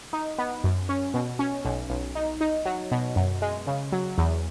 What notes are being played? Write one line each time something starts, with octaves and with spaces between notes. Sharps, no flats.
D#4
B3
F#2
C#4
B2
C#4
B1
B1
D#4
D#4
F#3
B2
F#2
G#3
C#3
F#3
E2